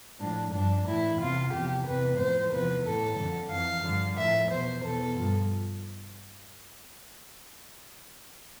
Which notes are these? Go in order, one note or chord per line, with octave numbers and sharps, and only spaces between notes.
A2 F3 D4
G2 F3 D4
A2 E3 E4
E2 C3 E3 F4
E2 C3 F3 G4
E2 C3 E3 B4
A2 F3 C5
E2 C3 F3 B4
A2 E3 A4
F2 D3 F3
F2 E3 F5
G2 D3 F3
A2 F3 E5
E2 B2 C5
E2 B2 A4
G2 F3